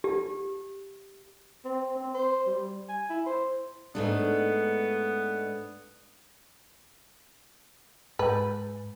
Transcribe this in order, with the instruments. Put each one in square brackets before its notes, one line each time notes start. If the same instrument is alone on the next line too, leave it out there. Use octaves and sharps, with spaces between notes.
[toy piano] G4
[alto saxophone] C4
C4
C5
G3
G#5
E4
C5
[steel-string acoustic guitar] G#2 A3 D4 [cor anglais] B3
[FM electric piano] G#2 [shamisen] B4